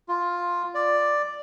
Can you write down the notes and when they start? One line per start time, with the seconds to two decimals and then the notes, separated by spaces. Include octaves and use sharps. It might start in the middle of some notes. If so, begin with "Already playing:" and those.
0.08 F4
0.75 D5